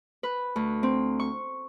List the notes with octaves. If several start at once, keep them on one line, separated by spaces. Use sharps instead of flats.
B4
D2
C4
C#6